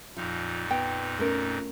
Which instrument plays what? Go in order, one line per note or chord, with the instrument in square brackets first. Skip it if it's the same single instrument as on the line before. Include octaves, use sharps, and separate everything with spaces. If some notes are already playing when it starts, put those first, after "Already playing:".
[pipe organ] F2 A#2 D#4 [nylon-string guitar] F3
[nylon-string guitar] B3 [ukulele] G5
[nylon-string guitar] A3 C#4 A#4